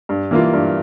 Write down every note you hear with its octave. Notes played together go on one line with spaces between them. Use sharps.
G2
E3 A#3 F4
G2